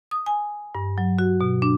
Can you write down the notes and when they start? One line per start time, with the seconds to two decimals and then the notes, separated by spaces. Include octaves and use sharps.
0.11 D#6
0.26 G#5
0.75 G2
0.98 F#3
1.19 F#4
1.41 B2
1.62 D4